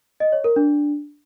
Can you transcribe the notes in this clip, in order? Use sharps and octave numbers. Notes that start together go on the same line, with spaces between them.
D#5
C#5
A#4
D4